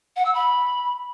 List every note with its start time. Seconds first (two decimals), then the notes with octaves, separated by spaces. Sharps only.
0.16 F#5
0.25 E6
0.34 B5